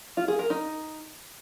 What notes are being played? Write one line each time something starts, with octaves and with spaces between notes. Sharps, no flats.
F4
G#4
A#4
D#4